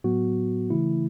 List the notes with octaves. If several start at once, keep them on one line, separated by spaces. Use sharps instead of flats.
A2 F#3 B3 F#4
C#3 E3 A3 E4